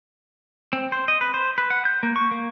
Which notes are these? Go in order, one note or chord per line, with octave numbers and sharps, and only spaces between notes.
C4
C5
D#5
B4
C5
B4
F#5
G6
A#3
C#6
A#3